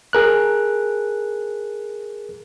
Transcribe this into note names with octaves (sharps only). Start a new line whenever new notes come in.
G#4 A#4 F#6